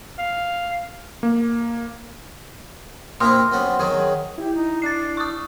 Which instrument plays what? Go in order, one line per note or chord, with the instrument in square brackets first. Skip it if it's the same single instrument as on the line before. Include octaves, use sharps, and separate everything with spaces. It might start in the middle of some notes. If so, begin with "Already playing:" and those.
[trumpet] F5
[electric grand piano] A#3
[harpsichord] A#2 D4 E4 [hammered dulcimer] C4 [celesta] C6 D#6 F6
[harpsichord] F#2 B3
[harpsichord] D#3 F#3 [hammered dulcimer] G#4
[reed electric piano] E4 [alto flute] G4
[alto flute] D#4
[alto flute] D4 [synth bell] A6 C7
[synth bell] C#6 D#6